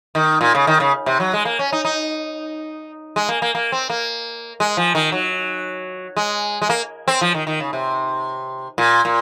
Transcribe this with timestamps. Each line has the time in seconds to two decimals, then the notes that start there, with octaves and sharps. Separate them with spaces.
0.15 D#3
0.41 A#2
0.55 C#3
0.67 D#3
0.80 C#3
1.06 C3
1.20 F#3
1.33 G#3
1.45 A#3
1.59 C#4
1.72 D#4
1.85 D#4
3.16 G#3
3.29 A#3
3.42 A#3
3.55 A#3
3.72 C4
3.90 A#3
4.60 G#3
4.77 F3
4.95 D#3
5.12 F#3
6.17 G#3
6.62 G#3
6.70 A#3
7.08 C4
7.21 F3
7.35 D#3
7.47 D#3
7.60 C#3
7.73 C3
8.78 A#2
9.05 A#2